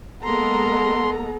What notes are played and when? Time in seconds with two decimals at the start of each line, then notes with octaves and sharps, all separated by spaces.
0.24 G#3 A#3 B3 A4 A#5 C6